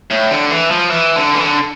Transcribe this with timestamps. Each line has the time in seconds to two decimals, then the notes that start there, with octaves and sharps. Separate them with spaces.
0.10 A2
0.31 D3
0.51 E3
0.70 F3
0.90 E3
1.16 D3
1.34 E3
1.43 D3